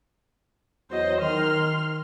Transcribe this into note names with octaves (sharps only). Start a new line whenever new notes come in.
E2 F#3 C5 D#5
D#3 C6 F6